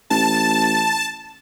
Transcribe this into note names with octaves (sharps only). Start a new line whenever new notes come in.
A1 A5